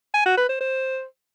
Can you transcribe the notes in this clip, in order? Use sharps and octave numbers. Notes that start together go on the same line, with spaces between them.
G#5
F#4
B4
C5
C5